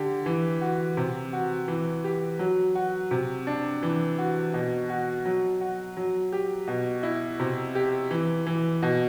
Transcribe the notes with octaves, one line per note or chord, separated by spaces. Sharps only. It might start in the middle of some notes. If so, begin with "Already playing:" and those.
Already playing: D3 G4
E3
F#4
C3
F#4
E3
G4
F#3
F#4
C3
D4
E3
F#4
B2
F#4
F#3
F#4
F#3
G4
B2
E4
C3
G4
E3
E3
B2